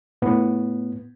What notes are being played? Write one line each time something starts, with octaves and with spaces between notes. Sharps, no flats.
A2 B3